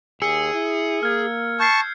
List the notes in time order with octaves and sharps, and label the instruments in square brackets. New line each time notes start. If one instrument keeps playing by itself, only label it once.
[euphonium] D#2 [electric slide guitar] G#4 [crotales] E6 C#7
[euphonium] E4
[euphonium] A#3 [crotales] F6 G#6
[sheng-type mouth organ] A5 C#6 [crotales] G6 C7